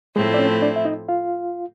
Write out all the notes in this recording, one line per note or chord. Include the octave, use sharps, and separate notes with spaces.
A2 F3 G#3 A3 C4 E4 G#4
D5
C#4 C#5
D4 D5
E5
D#4 D#5
F4 F5